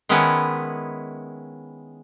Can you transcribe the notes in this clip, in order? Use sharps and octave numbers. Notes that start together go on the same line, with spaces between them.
D#3 G#3 B3 C#4 E4 B4